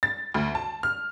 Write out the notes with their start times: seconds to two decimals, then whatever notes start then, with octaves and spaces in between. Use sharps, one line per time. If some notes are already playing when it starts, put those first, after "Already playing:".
0.03 A6
0.34 D2
0.55 A5
0.83 F6